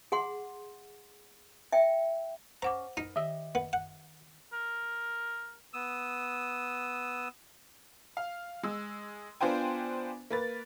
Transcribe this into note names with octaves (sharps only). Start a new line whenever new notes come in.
G#4 F#5 C6
E5 G5
C#4 C5 F#5 A#5 D6
D#4 A#4 B4
D#3 G4 D#5 E5 E6
B3
F#5
A#4
B3 D#6 E6
F5
G#3 E6
B3 D4 F4 C5 G5 G#5
A#3 B4 A6